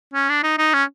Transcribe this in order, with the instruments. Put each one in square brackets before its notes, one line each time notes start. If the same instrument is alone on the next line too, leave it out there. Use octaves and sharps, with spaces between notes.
[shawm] C#4
D4
D#4
D#4
C#4